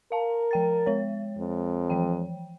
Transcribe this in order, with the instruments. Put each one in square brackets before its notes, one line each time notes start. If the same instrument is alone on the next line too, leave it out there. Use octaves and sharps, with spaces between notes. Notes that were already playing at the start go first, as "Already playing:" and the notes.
[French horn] A#4 [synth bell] F5 A5
[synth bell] F3 G5 A6
G#3 C#5
[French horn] F2
[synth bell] E3 F3 G5